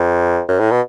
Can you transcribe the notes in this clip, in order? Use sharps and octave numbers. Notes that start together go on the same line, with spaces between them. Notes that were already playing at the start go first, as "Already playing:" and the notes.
Already playing: F2
F#2
A2
B2